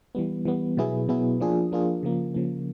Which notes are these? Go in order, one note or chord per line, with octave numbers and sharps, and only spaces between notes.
E3 G3 B3
E3 G3 B3
B2 F#3 B3 E4 G#4
B2 F#3 B3 E4 G#4
F3 A#3 D4 F4 G#4
F3 A#3 D4 F4 G#4
C#3 F3 A#3
C#3 F3 A#3